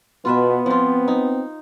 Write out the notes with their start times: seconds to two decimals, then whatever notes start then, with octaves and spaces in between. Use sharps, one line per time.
0.25 B2 B3 F4 B4 E5
0.66 F3 C4 F4
1.08 D#4